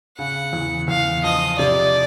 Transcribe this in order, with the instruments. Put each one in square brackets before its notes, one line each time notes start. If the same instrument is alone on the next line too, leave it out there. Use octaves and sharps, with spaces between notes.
[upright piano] C#3 [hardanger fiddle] F#5
[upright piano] E2
[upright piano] E2 [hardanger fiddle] F5
[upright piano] F3 [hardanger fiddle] D#5
[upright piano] C3 [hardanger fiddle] D5